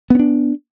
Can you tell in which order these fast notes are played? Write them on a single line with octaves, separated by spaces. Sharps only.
B3 C#4 D4